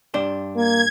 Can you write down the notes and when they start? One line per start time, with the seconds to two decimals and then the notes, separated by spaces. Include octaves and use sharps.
0.14 G2 D4 C5
0.56 A#3 G#6